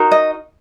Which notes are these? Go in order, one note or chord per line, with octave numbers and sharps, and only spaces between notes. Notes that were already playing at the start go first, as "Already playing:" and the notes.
Already playing: D#4 F#4 A#4
D#5